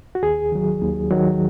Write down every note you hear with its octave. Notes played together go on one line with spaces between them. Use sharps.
F#4
D#2 G#4
D#3 F#3
D#2
D#3 F#3